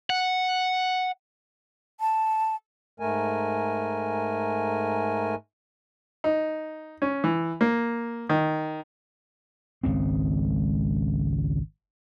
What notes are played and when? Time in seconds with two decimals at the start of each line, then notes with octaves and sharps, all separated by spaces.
0.10 F#5
2.00 A5
3.00 G#2 A3 A#4 G#5
6.24 D#4
7.02 C#4
7.24 E3
7.61 A#3
8.29 D#3
9.83 G#1 C#2 C#3 C4